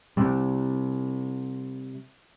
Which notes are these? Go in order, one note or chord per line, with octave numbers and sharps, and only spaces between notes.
C3 G3